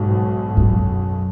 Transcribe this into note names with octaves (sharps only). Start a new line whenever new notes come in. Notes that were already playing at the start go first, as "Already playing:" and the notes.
Already playing: B1 G#2 B2 F#3
F#2